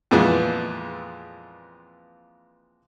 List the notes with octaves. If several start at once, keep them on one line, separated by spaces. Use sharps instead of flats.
F2 A#2 E3 G#3 B3